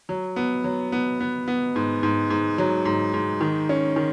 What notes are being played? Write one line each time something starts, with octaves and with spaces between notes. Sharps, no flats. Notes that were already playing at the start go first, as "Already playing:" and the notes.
F#3
B3
F#3
B3
B3
B3
G#2
G#2
G#2
F#3
G#2
G#2
D#3
C#4
D#3